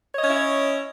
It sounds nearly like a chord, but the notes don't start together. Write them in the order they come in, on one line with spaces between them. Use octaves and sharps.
C#5 D#5 C#4 E4